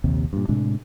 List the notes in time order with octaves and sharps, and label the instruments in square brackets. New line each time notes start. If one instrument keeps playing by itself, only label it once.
[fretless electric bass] A#1 D#2 C3
G2 A#2
A2 C3 G#3 D4